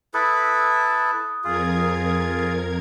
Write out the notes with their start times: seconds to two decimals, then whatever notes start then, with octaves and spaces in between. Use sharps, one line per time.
0.14 E4 A4 B4 D#6
1.44 F2 F4 G#4 A#4 G#6